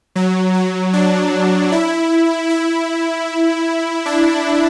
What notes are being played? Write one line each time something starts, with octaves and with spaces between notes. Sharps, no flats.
F#3
F#3
D4
E4
E4
D4